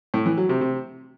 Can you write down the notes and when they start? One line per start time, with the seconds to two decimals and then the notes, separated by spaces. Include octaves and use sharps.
0.14 A2
0.26 E3
0.37 F#3
0.49 C3
0.61 C3